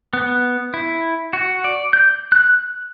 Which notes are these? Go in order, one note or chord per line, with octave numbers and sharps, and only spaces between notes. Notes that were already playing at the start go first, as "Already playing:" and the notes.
B3
E4
F#4
D5
G6
F#6